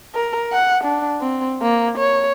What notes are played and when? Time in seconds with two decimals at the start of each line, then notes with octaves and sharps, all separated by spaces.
0.15 A#4
0.52 F#5
0.84 D4
1.21 C4
1.62 A#3
1.98 C#5